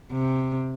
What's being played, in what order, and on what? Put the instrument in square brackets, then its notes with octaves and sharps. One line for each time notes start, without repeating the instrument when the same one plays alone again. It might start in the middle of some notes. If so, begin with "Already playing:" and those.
[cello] C3